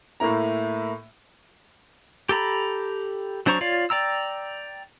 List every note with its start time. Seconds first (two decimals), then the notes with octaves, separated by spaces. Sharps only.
0.20 A2 A3 A#3 E4 A#5
2.29 G4 A4 A#5 B5
3.46 F#3 D4 C5 A#5 C#6
3.61 F4 C#5 D5 F5
3.90 D5 G5 A#5 E6